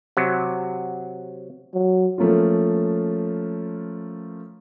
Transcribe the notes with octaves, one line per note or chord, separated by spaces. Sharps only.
C3 F#3
F#3
F3 A3 A#3 C#4 F4